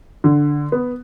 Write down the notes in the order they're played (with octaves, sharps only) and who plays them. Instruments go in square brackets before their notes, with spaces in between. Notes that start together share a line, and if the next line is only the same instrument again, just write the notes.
[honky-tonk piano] D3
B3